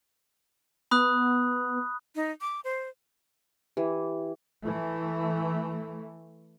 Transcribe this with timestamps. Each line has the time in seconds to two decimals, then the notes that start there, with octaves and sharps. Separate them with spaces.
0.91 B3 B5 D#6 F#6
2.15 D#4
2.41 D6
2.64 C5
3.77 E3 G4
4.65 E3 A3